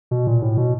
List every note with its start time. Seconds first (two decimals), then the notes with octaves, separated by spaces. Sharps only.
0.11 B2
0.27 A#2
0.42 A2
0.57 B2